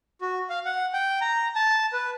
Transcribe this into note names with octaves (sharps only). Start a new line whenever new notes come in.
F#4
F5
F#5
G5
A#5
A5
B4